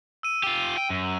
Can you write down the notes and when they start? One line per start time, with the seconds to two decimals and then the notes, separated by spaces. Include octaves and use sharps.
0.23 E6 D#7
0.43 F4 G4
0.77 G5
0.90 F#2